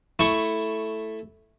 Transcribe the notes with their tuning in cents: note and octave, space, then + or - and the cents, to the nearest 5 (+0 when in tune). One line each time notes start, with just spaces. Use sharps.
A3 +0 E4 +0 C#6 +0